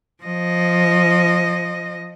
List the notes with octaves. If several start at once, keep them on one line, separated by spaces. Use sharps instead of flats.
F3 D#5